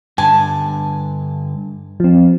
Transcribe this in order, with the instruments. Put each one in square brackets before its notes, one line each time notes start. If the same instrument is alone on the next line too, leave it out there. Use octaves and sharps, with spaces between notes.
[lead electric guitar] G2 D3 [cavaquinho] G#5 A5
[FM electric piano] F3 C4